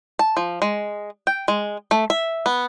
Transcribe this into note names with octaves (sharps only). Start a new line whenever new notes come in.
A5
F3
G#3
G5
G#3
A3
E5
B3